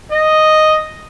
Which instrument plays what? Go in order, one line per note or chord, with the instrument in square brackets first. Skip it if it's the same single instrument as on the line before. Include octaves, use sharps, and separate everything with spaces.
[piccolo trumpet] D#5